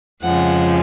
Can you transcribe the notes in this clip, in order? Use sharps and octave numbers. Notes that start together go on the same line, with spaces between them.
F2 C#3 F3 G#3 F#5